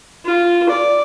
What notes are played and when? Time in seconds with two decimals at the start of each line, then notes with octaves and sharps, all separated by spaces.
0.25 F4
0.69 D5